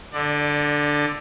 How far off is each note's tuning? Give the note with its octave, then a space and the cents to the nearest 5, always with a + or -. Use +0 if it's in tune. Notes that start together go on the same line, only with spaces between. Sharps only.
D3 +0 D5 +20